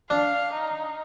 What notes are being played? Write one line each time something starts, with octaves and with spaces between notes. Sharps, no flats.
D4 F5
D#4